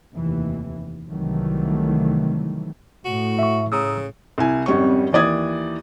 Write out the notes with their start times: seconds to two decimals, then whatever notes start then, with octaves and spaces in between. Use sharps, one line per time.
0.13 F1 D#2 E3
1.08 C2 D#3 E3 F#3 A3
3.05 A2 F#4
3.39 E5 C#6
3.72 C#3 A#5 D#6 E6
4.38 C2 E4 G#5
4.66 G#1 F2 G3 C#4 C#6
5.12 D#2 E3 D5 D#6 G#6